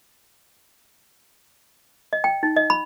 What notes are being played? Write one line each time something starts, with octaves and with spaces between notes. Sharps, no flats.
D#5
G5
D#4
D#5
B5